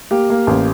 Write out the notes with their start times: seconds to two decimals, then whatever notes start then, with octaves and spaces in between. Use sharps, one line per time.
0.11 A#3 G4
0.30 A#3
0.47 A1